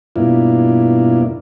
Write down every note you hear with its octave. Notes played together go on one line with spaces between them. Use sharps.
G2 B2 A#3 D4 E4 F4